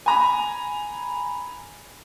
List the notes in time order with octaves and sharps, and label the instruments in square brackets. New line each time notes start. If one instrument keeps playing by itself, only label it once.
[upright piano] G#5 A#5 B5